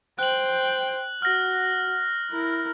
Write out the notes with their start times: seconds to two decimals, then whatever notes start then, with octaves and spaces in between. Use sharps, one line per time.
0.19 C5 G5 F#6 F#7
1.22 F#4 F6 A#6
2.30 E4 A#4